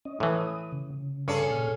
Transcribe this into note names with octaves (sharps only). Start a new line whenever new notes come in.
C#4 D#5
A2 E3 D#6
C#3
G2 C#4 G#4 A4
A#2 F6